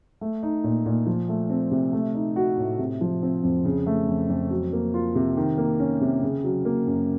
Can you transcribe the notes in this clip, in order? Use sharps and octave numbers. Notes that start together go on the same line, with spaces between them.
A3
D#4
A#2
A#2
F3
A3
C4
C3
A3
D#4
F#4
A2
C3
F3
C4
F2
C#3
A3
F2
F2
F#3
A#3
F4
C3
D#3
A#3
C#4
C3
C#3
F#3
A#3
F#2